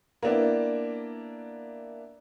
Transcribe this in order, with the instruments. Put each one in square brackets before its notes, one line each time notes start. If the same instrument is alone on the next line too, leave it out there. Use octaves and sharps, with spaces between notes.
[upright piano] A#3 B3 D4 E4